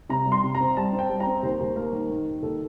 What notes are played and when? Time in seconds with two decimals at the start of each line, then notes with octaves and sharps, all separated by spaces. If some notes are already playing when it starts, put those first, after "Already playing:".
0.09 C3 A#5
0.26 G3
0.32 C6
0.44 C3
0.55 A#5
0.60 C4
0.77 G3 A5
0.93 C4
0.99 G5
1.09 G3
1.20 A#5
1.27 C4
1.43 D#2 C5
1.60 D#2
1.76 A#3 A#4
1.93 D#3
2.10 D#3
2.27 D#3
2.42 D#2 A4